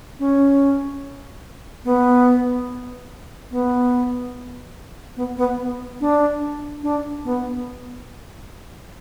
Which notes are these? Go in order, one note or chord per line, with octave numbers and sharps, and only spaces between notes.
C#4
B3
B3
B3
B3
D4
D4
B3